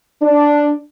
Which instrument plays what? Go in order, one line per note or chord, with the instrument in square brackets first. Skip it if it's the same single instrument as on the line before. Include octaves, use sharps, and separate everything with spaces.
[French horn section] D4